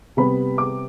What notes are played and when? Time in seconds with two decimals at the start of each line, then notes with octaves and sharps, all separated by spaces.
0.17 C3 G3 B3 B5
0.58 D6